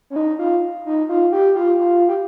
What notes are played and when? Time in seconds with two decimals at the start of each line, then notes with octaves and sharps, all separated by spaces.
0.10 C#4
0.16 D#4
0.39 F4
0.86 D#4
1.09 F4
1.32 G4
1.55 F4
1.79 F4
2.09 G4